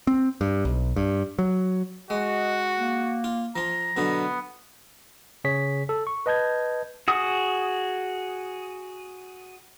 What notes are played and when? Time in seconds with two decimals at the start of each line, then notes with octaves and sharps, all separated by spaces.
0.07 C4
0.41 G2
0.65 B1
0.96 G2
1.39 F#3
2.10 G#3 F#4 D#5
2.79 A#3
3.24 F4
3.56 F3 F4 A#5
3.97 B2 D3 F#3 B3
5.44 C#3 G#4 C#5 B6
5.89 A4
6.07 C#6
6.26 B4 D#5 A5 G6 G#6
7.08 F#4 G#4 D#6